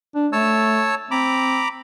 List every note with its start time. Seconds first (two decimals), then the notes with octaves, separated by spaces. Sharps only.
0.15 D4
0.33 A3 C#5 A5 E6
1.11 C4 A#5 B5 D6